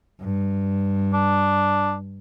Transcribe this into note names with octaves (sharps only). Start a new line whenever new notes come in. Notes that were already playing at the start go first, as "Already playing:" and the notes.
G2
D4